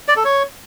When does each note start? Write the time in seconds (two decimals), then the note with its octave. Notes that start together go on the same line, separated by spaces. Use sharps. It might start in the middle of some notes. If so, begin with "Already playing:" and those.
0.08 D5
0.16 A4
0.25 C#5